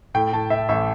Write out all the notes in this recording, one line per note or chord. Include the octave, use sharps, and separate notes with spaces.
A2 G5
A2 A5
A2 E5
A1 E5